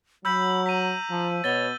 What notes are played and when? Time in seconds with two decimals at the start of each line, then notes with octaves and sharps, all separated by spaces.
0.25 F#3 B5 E6 G6 F#7
0.66 A#5 B6 D#7
1.10 F3
1.44 B2 C#5 A6 G7